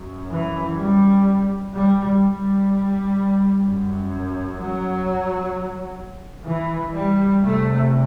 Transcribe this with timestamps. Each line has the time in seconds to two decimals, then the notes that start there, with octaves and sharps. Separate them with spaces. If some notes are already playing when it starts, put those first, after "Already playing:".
Already playing: F#2
0.30 E3
0.78 G3
1.72 G3
2.20 G3
3.62 F#2
4.57 F#3
6.46 E3
6.94 G3
7.41 E2 C3 A3